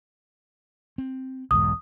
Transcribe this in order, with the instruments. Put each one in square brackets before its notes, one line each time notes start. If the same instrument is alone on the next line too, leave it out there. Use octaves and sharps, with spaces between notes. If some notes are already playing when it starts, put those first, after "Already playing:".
[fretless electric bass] C4
[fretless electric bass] B1 E2 G#2 [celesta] D#6